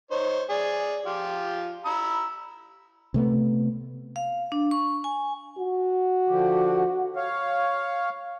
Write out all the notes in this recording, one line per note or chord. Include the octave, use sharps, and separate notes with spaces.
D#4 C5 C#5
G#4 D5
F3 F4 G4
A#5 B5 E6
C3 A3 B3
F5
D4
C#6
G#5
F#4
D3 F3 G4
C#5 F5